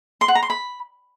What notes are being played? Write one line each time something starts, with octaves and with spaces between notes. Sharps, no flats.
C6
F#5
A#5
C6
B5